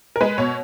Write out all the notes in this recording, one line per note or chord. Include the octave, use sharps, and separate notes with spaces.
A#4
G#3 B4
B2 C#5